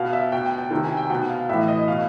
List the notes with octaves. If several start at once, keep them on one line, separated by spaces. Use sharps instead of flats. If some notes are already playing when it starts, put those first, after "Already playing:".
Already playing: B2 F5
E5
B2 G5
G5
G5
C3 D#3
G#5
G5
B2 F#5
F5
A2 E3 E5
D#5
B2 F5